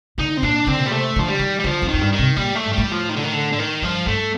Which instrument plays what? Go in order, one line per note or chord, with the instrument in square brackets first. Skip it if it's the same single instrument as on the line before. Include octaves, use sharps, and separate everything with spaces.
[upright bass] D3 [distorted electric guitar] D#4
[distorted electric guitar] C4
[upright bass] A#2 [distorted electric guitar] D4
[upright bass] D3 [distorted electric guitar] C4
[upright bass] A#2
[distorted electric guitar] G3
[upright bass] C3 [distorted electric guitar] A3
[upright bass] D3 [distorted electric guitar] F3
[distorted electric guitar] G3
[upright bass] D#3
[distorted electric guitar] G3
[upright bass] D3 [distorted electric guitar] F3
[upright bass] F2
[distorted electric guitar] D#3
[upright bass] F2
G2
[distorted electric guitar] D#3
[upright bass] C3
[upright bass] A#2 [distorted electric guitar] G3
[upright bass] A2
[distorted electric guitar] A3
[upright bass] G2
[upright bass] A2 [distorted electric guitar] G3
[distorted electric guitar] F3
D#3
D3
D#3
D3
D3
D#3
[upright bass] G2 [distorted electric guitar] F3
[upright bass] G2 [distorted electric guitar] A3